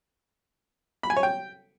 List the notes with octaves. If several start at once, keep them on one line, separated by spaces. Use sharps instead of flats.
B5
G#5
C#5
G5